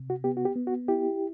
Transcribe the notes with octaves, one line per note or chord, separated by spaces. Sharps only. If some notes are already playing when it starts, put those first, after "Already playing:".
Already playing: C3
F#4
B3 G4
F#4
G4
B3
F#4
E4 G4